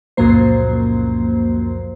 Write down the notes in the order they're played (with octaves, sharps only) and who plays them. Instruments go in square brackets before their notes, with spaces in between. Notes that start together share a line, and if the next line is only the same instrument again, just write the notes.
[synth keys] C#2 F#2 A#2 F3 A#3 C5